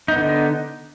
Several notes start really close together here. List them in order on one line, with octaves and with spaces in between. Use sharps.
D#4 B3 D3